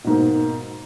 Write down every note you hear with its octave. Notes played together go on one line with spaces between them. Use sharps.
G#2 B2 A#3